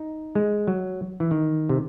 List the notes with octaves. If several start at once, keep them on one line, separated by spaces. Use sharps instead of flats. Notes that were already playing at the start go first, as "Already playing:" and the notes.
Already playing: D#4
G#3
F#3
E3
D#3
C3